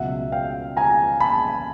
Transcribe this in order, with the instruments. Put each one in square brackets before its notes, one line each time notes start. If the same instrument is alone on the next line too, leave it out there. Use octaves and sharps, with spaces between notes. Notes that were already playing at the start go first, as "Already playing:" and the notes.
Already playing: [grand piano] C#2 B2 F#3 E5 F#5
F5 G5
G#5 A#5
A5 B5